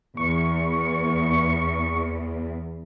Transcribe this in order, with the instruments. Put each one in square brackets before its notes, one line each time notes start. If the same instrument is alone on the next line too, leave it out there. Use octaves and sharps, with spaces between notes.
[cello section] E2 [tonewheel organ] C#6